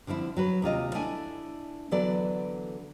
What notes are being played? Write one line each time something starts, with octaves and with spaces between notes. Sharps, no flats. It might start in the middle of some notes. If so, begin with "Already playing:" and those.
D3 F3 C4 E4
F#3 F#4 B4
D#2 C3 F4 D#5
A3 D4 E4 G#5
D3 E3 F#3 B3 A4 D5